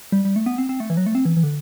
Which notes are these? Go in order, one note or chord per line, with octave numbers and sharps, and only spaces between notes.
G3
G3
A3
B3
C4
C4
A3
E3
F#3
A3
C4
E3
E3
D3